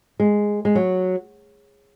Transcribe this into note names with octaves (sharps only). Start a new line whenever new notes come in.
G#3
G#3
F#3